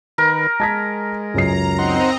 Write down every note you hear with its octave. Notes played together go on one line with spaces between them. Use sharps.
D#3 A#4 B4
G#3 A5 G#6 B6
C#2 F#2 A#5 C7
C4 D#4 D#5 F#5 A#5 C6